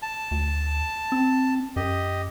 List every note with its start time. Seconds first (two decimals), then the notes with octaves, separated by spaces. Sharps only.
0.02 A5
0.31 D2
1.12 C4
1.76 F#2 G4 D#5